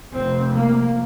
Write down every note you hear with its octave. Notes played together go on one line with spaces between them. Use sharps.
F1 F2 C3 C4
A#3